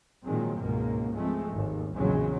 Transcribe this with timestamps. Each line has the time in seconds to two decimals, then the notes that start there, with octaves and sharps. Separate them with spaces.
0.24 A#2 D#3 F3 F#3 G#3 C4
0.58 G#1 C#2 G#2 B2 A#3
1.13 F3 G#3 A3 C4
1.53 G#1 D#2
1.95 A#1 E2 C#3 F#3 G#3